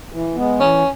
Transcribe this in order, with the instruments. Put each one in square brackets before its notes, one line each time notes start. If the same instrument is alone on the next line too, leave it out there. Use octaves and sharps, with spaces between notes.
[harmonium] E3
G#3 B3
[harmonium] E3 [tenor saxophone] C#4